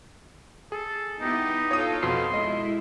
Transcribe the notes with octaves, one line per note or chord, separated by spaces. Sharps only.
G#4 A4
B3 D#4 E4 G4
F4 A4 C#5 D#6
F2 B2 C6 C7
G#3 E4 D#5